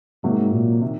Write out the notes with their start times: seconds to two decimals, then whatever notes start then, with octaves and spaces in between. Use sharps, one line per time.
0.24 G#2 C3 F#3 A#3
0.53 A#2
0.82 C3 D#3